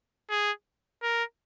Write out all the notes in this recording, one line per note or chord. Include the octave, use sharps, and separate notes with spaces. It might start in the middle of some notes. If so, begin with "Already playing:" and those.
G#4
A#4